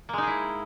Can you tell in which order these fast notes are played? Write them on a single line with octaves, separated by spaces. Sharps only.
A#3 G#3 D#4 G#4 E4